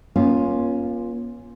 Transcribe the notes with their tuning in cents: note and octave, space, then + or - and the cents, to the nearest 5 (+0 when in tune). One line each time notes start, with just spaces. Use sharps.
A#3 +45 C#4 +0 F4 +0